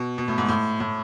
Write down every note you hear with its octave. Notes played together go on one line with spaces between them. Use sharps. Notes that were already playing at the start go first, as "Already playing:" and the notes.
Already playing: B2
B2
A2
G#2
A2
A2